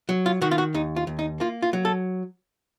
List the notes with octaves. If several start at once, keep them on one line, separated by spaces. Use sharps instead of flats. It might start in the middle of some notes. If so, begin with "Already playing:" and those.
F#3
F4
D#3 F#4
F4
F#4
D#2 D#4
F4
D#2
D#4
A#3 F4
F4
F#3
A4